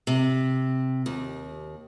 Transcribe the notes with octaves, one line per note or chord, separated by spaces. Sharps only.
C3
D#2